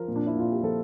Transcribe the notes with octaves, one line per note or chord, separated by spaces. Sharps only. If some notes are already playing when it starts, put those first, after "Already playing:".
Already playing: F3 A#4
A#2
D4
E4
A#2 F4
G4
F3 A4